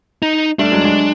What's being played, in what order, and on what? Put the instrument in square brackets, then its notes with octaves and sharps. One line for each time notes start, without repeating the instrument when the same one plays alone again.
[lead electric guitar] D#4
[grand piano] G3 A3 [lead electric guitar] D4
[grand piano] F#3 G#3
F#3 G#3